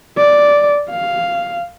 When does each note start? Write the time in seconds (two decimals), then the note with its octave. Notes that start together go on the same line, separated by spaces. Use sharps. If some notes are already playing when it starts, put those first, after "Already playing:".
0.18 D5
0.90 F5